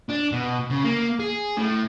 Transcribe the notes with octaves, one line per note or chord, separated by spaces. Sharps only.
D4
B2
C#3
A#3
G#4
A2